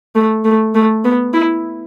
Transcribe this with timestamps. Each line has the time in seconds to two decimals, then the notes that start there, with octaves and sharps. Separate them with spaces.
0.15 A3
0.45 A3
0.75 A3
1.04 B3
1.34 E4